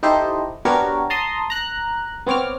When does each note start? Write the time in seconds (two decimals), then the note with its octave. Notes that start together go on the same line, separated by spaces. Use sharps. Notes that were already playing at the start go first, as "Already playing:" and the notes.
0.03 D#4 E4 G4 A4 C5 D#5
0.65 B3 D4 F#4 G4 A#4 C#5
1.10 A5 A#5 C6 D#6
1.50 A#5 F#6
2.27 B3 C4 C#5 D6 F6